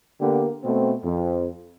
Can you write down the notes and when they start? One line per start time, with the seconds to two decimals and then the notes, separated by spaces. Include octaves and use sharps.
0.21 D3 A#3 B3 G4
0.64 B2 A3 C4
1.03 F2